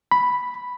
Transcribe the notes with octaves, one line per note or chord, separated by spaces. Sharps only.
B5